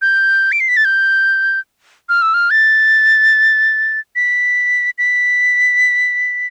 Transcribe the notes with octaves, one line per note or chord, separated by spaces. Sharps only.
G6
D7
C7
B6
A6
G6
F6
E6
F6
A6
B6
B6